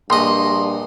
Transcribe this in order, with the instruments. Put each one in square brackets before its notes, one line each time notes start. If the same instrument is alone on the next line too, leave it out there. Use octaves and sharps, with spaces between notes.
[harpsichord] A#1 D#5 [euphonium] G2 [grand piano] C6